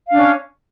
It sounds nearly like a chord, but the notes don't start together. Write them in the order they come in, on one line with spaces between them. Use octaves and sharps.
F5 D4 C#4